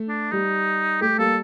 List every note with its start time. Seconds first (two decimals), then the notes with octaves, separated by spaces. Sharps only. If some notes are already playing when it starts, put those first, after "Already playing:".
Already playing: A3
0.09 D4
0.32 G3 D#4
1.01 A3 G4
1.18 G3 A#3 A4